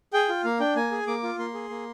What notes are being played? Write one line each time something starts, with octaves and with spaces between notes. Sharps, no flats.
G#4 G5
F4
A#3 F5
D4 G5
A#3 G#5
G#4
A#3 D6
F4
A#3 C6
G#4
A#3